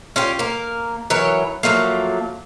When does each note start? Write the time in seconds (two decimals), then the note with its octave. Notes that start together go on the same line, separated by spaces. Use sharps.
0.16 C#4 F4 G4
0.39 A#3 A#4
1.10 E3 F#3 A#4 C#5
1.63 F3 F#3 A3 A#3